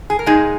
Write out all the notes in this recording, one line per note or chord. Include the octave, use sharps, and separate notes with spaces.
G#4
A#4
A#2 G#3 D#4 G#4